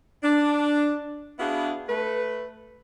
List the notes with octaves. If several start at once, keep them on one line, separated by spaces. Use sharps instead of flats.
D4
B3 D4 E4 F#4 G#4 F5
A3 B4